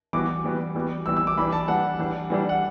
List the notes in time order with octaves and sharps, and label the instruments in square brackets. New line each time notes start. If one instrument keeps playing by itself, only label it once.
[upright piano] E3 G3 B3 F#4 [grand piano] D6
[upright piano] E3 G3 B3 F#4
E3 G3 B3 F#4
[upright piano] E3 G3 B3 F#4 [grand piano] E6
[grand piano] E6
D6
[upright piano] E3 G3 D4 [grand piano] B5
[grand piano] A5
[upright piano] E3 G3 D4 [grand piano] F#5
[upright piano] E3 G3 D4
E3 G3 D4
[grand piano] F#5